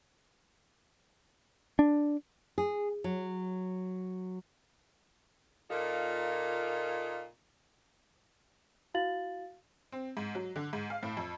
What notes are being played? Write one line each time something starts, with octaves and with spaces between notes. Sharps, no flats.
D4
G#4
F#3
A#2 A#3 D#4 F4 A4
E4 F#4 F5 A6 F#7
C4
G#2
F#3
D3
G#2
F5
A2
F2